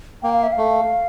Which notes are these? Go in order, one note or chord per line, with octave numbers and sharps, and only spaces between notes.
A#3 G5
F5
E5
A3 F5